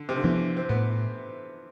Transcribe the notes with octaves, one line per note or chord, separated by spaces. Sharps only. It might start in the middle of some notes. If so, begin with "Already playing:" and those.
Already playing: D3
C3
D3
E3 F3 B3 D4
C4
A2 B3